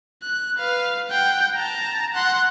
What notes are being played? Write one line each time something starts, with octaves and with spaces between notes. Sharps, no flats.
F#6
B4 F5
F#5 G5
A5 A#5
F#5 C6